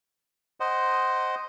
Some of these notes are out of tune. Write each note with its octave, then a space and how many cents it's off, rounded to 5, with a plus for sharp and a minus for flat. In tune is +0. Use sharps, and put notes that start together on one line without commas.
C5 +0 D#5 +0 F#5 +25